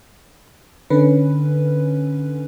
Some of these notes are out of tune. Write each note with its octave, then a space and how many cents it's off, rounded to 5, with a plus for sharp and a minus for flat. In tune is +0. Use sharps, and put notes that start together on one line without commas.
D3 +15 C#4 +0 B4 +0